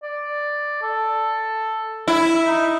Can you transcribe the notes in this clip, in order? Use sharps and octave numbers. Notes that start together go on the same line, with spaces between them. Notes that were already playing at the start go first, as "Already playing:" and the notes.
D5
A4
E4
D#4